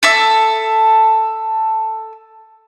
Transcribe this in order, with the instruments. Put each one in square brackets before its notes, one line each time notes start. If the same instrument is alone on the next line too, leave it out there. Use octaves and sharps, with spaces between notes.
[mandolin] A4 E5 E6